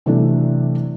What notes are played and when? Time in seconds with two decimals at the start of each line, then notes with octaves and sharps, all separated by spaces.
0.06 C3 E3 F#3 A3 D4